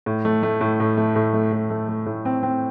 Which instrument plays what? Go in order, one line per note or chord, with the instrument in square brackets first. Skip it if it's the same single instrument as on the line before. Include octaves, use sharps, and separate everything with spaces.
[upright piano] A2
A3
A3
A2
A2
A3
A2
A3
A2
A3
A3
A2
C4
C4